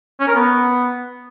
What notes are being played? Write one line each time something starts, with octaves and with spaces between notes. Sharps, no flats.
C#4
A#4
B3